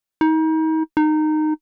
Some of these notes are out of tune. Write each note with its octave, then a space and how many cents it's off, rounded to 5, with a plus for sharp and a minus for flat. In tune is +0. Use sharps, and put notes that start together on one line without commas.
D#4 +35
D#4 -15